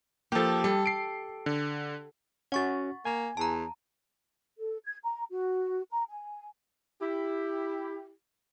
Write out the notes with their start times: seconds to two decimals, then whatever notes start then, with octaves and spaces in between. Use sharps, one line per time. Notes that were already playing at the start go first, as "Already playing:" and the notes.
0.32 F3 A#3 G4 A4
0.64 G3 A4
0.86 C7 D7
1.46 D3
2.52 C#4 F#4 F#5 C#6 A6
3.05 A#3 G#5
3.37 E2 A5 A#5
4.58 A4
4.85 G#6
5.04 A#5
5.31 F#4
5.91 A#5
6.09 G#5
7.02 E4 G4